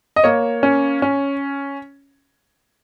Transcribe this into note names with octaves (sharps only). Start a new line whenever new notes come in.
D#5
A#3 C#5
C#4
C#4